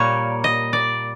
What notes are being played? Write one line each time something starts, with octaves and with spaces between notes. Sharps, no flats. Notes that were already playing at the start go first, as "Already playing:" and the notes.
Already playing: A#2 G3 A#3 C#5
D#5
D5